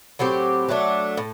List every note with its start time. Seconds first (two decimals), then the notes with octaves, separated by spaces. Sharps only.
0.19 A2 F#3 C4 G4
0.68 F#3 A3 D4
1.17 A2